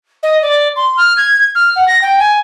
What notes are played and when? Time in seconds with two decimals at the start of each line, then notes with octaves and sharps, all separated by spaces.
0.23 D#5
0.42 D5
0.76 C6
0.97 F6
1.17 G#6
1.55 F6
1.76 F#5
1.88 A#6
2.01 G5
2.19 G#5